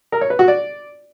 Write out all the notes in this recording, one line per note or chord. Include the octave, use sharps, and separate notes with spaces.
A#4
C#5
B4
F#4
D5